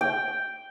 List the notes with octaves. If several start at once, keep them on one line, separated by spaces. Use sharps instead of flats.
G5